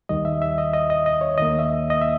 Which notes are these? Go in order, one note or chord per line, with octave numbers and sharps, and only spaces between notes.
D#2 D#3 G3 D#5
E5
E5
D#5
D#5
D#5
D#5
C#5
D#2 D#3 A#3 D#5
E5
D#5
E5